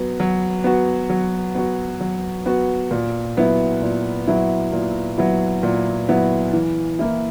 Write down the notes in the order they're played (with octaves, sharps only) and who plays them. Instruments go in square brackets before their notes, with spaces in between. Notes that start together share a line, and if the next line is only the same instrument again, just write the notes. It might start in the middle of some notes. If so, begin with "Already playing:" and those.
Already playing: [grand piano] F#3 B3 F#4
F#3
B3 F#4
F#3
B3 F#4
F#3
B3 F#4
A#2
F#3 B3 E4
A#2
F#3 B3 E4
A#2
F#3 B3 E4
A#2
F#3 B3 E4
E3
A#3 E4